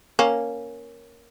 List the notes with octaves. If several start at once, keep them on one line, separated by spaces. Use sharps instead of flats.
A#3 C#4